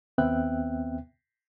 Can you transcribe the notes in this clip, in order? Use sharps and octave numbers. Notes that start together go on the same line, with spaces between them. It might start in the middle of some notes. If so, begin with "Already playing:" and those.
D#2 B3 C4 E5 G5 F#6